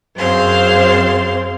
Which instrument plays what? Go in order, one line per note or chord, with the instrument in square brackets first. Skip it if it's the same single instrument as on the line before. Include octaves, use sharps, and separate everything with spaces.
[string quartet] F#2 C4 G#4 C5 F5 C6